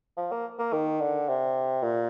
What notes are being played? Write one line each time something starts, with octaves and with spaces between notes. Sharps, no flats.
F3
A#3
A#3
D#3
D3
C3
A#2